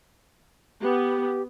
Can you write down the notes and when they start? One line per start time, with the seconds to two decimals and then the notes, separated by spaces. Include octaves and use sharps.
0.82 B3 G4